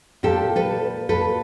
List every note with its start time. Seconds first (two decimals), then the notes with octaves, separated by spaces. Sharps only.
0.23 A#2 G4 A4
0.56 A4 B4
1.09 A4 B4